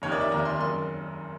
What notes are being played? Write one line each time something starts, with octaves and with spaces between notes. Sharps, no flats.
F1 D#2 D#3 C#5
D5
E5
F1 D#2 D#3 A#5
C6
F#1 F#2 D#3 C6